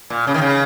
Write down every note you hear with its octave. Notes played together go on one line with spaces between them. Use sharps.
A#2
C#3
D#3
C#3